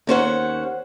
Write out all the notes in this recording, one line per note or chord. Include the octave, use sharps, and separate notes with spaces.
D#2 C#4 C5 F#5